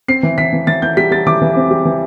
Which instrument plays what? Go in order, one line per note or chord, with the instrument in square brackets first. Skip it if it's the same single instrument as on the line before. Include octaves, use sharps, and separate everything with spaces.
[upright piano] C4 C7
E3
E3 B6
E3
E3 A6
E3 G6
G3 B6
G3 A6
E3 D6
E3
C4
G3
E3